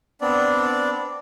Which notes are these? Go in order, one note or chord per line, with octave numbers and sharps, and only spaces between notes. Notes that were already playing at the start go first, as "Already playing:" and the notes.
B3 C4 D4 D5